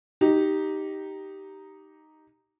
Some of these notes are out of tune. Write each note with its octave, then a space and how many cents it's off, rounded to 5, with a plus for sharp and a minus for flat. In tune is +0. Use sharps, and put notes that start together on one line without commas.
D#4 +0 G4 -10